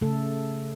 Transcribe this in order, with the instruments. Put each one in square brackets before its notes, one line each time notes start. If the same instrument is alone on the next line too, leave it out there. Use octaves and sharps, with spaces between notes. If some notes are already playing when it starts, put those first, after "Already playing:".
[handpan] C#3 A3 A4